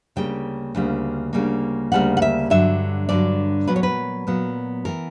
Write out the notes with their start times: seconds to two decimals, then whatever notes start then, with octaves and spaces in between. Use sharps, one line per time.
0.16 D2 C#3 G3 A#3 G5
0.75 D2 C#3 G3 A#3
1.33 D2 C#3 G3 A#3
1.92 D2 C#3 G3 A#3 F#5
2.17 F#5
2.22 E5
2.50 G2 D3 F#3 E5
3.09 G2 D3 F#3 D5
3.67 A#2 F#3 B3 B4
3.76 C#5
3.83 B4
4.27 A#2 F#3 B3
4.85 E3 B3 A#4